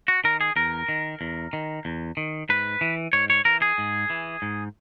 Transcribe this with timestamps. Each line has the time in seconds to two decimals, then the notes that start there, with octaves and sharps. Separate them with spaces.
0.08 F#4
0.24 D#3 A#4
0.41 G#4
0.56 E2 A#4
0.89 D#3
1.21 E2
1.53 D#3
1.85 E2
2.17 D#3
2.49 G#2 B4
2.81 E3
3.13 G#2 C#5
3.30 C#5
3.45 E3 A#4
3.62 G#4
3.78 G#2
4.10 E3
4.42 G#2